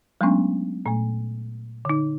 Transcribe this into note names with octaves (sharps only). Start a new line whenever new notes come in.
F#3 G#3 A3 B3 C#4 D4
A#2 A3
D3 D#4